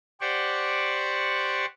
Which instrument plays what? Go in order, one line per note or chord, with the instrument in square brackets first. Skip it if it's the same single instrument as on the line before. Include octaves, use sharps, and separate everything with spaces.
[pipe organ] G4 C5 D5 F#5 C#6